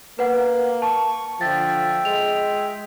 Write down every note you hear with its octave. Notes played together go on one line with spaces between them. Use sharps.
A#3 B4 F#5
A5 C#6
D3 F3 E5 G5 A6
G#3 F7